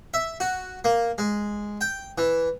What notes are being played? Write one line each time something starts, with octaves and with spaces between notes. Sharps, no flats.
E5
F#4
A#3
G#3
G5
E3